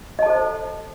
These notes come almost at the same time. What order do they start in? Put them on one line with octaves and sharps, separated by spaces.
D#5 A5 A4 C5